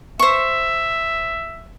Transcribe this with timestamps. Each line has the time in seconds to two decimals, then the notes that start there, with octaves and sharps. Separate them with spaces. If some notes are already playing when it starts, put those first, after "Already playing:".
0.19 C5 E5 C#6